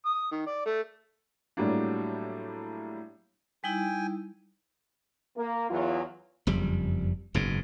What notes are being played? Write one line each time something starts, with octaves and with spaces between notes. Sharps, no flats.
D#6
D#3
D5
A3
A2 F#3 G3 A#3 D4
G3 D#4 E4 G5 G#5
A#3
E2 F#3 F4
F#1 F2 G3
F#1 G#2 B2